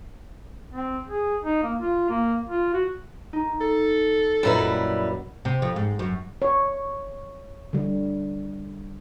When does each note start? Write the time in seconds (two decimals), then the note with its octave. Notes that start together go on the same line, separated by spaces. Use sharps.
0.73 C4
1.08 G#4
1.44 D#4
1.63 A#3
1.78 F4
2.10 A#3
2.49 F4
2.74 F#4
3.33 D#4
3.61 A4
4.43 F#2 A#2 G3 E4 B4 D#5
5.45 C3
5.62 F2
5.76 G#2
5.99 F#2
6.42 C#5
7.73 D3 G3